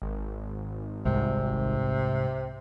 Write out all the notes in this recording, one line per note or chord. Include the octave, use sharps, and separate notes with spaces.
G#1
C2 G#2 C3